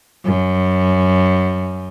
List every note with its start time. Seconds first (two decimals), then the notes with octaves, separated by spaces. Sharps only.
0.25 F#2